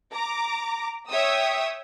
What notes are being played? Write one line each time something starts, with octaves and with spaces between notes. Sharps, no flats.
A#5 D6
C#5 E5 G5 D#6 E6